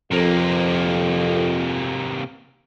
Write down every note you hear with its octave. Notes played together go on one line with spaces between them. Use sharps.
F2 C3 A#3